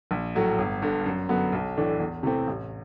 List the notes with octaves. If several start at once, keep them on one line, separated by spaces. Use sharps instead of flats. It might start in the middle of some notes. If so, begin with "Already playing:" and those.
A#1
A2 F#3 A3
G1
G2 D3
F#2
D3 F#3 B3
B1
A2 E3 A3 D4
E2
C3 E3 A3 C4
A1